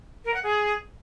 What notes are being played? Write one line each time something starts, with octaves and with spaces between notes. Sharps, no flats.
A#4
F#5
G#4